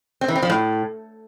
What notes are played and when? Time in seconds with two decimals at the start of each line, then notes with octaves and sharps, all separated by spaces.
0.21 C4
0.28 E3
0.35 C4
0.43 F3
0.50 A2